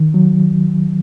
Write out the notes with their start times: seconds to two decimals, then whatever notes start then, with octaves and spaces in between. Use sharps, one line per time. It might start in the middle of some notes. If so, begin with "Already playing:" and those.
Already playing: D#3
0.14 F#3